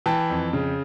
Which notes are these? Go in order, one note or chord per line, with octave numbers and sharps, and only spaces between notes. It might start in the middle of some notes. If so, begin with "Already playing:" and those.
E3 G5 A5
F2
C#3